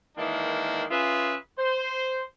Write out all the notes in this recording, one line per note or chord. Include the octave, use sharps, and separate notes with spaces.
D#3 E3 G#3 A#3 D4
C#4 F4 G#4 B4 E5
C5